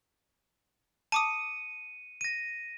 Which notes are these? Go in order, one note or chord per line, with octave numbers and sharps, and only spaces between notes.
A5 D6 D#6 C#7 D#7
A#6 D#7